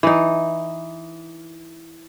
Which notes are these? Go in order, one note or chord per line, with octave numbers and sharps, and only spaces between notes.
E3 D#4